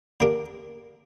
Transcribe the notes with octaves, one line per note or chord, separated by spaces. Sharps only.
D3 A#3 D4 G4 A#4